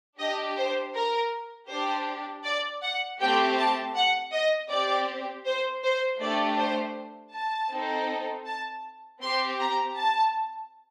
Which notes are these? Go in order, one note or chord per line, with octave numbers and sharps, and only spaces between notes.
D4 G4 D#5
C5
A#4
D4 G4 C5
D5
F#5
A3 C4 G4 G5
A5
F#5
D#5
C4 G4 D5
C5
C5
A3 D4 G4 D5
C5
A5
C4 D#4 A4
A5
C4 G4 C6
A#5
A5